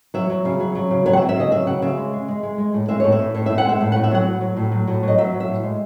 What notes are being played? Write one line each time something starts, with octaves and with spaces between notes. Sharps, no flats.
F#3 E5
F#3
C#3
F#3
F#3
C#3
F#3 C#5
F#5
E5
F#3
E5
C#3 D#5
F#3 E5
C#3 F#5
C#3 E5
G#3
G#3
G#3
G#3
G#3
A2
G#3 E5
A2 C#5
E5
A2
A2 C#5
A2 E5
F#5
G#3 E5
A2
A2 F#5
E5
F#3 F#5
A2
F#3
A2
F#3
A2
F#3 D#5
F#3 E5
F#3
E5
A2
G#3